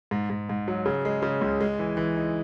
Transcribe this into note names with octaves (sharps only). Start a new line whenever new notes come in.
G#2
G#2
G#2
F#3
C#3
G#3
C#3
C#2
G#3
E3
E3
D#4